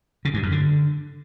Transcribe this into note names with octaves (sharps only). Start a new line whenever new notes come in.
C#3
G2
F#2
D3